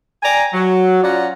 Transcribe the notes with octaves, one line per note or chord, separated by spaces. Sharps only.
D5 G5 G#5 A#5
F#3
C#4 F4 D5 F#5 A#5